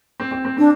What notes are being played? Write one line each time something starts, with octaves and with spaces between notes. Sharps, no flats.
C4
C4
C4
C4 D4